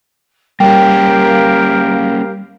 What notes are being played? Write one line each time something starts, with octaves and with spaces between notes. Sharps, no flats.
G3 A#3 C#4 G4 A#4 F5 G5